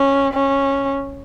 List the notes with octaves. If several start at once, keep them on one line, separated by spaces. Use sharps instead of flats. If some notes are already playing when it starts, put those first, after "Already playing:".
Already playing: C#4
C#4